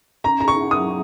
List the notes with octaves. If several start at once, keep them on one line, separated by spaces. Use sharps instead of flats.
C#4 A#5
G#4 A#5
C#6
F#5
F#3 D#6